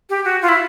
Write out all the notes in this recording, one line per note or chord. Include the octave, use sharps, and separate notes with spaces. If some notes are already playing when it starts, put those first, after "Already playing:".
G4
F#4
F4
E4